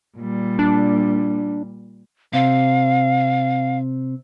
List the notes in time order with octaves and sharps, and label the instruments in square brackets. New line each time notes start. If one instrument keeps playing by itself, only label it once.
[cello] A#2 G3
[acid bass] D4
[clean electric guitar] C3 C4 [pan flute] F5